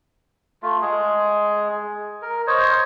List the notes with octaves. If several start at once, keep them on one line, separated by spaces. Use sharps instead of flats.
A3 F4
G#3 G#4
A#4
C5 C#5 D#5